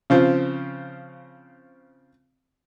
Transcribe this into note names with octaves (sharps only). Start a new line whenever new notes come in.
C#3 F3 C4